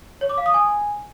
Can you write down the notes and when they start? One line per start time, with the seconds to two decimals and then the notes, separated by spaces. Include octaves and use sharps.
0.21 C#5
0.29 D6
0.38 F5
0.46 D#6
0.54 G#5